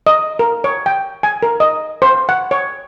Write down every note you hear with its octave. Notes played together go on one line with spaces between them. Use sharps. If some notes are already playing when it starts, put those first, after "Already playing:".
D#5
A#4
C#5
G5
G#5
A#4
D#5
C5
F#5
C#5